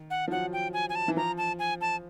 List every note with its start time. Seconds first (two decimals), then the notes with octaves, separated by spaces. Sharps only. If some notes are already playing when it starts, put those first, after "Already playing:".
Already playing: D#3
0.10 F#5
0.28 F3
0.31 F#3 F#5
0.53 G5
0.73 G#5
0.90 G#5
0.95 A5
1.08 E3
1.16 F3 A#5
1.38 A5
1.59 G#5
1.81 A5